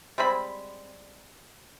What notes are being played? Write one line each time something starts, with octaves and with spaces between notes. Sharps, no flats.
G3 G#3 C4 B5